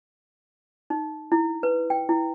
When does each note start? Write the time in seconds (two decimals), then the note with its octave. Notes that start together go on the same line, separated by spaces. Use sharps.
0.90 D#4
1.32 E4
1.63 B4
1.90 G5
2.09 E4